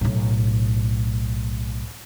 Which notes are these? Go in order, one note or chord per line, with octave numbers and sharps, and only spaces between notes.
B1 A2